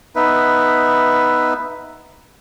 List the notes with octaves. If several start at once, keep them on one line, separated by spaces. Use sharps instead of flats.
B3 D#4 B4 E5